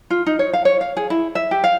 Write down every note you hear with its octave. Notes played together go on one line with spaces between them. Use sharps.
F4
D#4
C#5
F5
C#5
F5
G#4
E4
E5
G4
F5